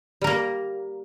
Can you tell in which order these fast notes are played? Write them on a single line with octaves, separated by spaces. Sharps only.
G3 A#4 A#3